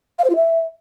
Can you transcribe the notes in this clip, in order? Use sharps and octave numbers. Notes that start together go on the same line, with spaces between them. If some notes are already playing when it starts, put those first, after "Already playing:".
F5
C5
F4
E5